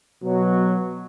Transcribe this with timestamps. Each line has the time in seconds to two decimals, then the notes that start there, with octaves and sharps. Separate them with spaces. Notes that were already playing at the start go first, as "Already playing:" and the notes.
0.24 B2 F#3